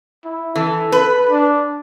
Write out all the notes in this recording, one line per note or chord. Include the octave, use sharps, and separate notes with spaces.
E4
E3 A4
B4
D4